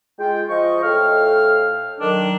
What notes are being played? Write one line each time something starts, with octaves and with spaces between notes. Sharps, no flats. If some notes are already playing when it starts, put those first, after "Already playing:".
G#3 F4 G5
F3 D#5 C#6
A2 A4 F5 G5 F6
D#3 F#3 D4